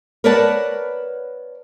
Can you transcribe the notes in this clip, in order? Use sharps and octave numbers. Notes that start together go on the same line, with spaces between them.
A#4 B4 C#5 D5 F#5 A5